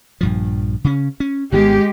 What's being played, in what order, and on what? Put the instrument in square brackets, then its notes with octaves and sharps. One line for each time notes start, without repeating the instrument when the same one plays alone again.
[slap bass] A#1 G2 F3
C#3 C#4
C#4
[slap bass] G#1 D#3 B3 [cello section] G#3 G4